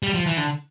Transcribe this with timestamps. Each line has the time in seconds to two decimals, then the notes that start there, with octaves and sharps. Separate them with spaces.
0.03 G3
0.14 F3
0.26 E3
0.37 D3